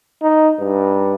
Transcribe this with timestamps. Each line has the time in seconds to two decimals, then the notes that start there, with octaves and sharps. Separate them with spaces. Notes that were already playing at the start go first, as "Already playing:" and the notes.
0.22 D#4
0.59 G2